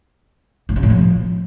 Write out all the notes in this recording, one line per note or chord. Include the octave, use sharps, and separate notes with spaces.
A2
C3
A2
F3